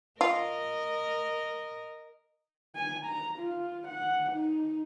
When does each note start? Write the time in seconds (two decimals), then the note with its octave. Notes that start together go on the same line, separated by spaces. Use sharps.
0.21 F4 A#4 D#5
2.76 G#5
3.06 A#5
3.39 F4
3.88 F#5
4.33 D#4